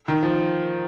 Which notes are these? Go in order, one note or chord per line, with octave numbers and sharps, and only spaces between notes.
D#3
F3